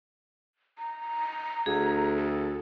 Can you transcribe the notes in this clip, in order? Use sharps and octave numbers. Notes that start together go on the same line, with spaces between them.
A#5
D2 G#4
A4